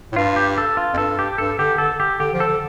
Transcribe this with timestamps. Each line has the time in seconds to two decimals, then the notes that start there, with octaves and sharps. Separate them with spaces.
0.12 A2
0.16 G2 F4
0.36 G4
0.58 A4
0.77 F4
0.94 F2
0.98 G2 A4
1.19 G4
1.38 G2 A4
1.59 D3 G4
1.78 D3 A4
2.00 G4
2.19 D3 G4
2.33 F3
2.40 A4
2.47 D3